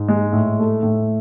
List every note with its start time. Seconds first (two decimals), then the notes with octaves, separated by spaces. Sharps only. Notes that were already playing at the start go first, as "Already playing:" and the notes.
Already playing: G#2
0.09 G#3
0.33 A2
0.59 A3
0.83 A2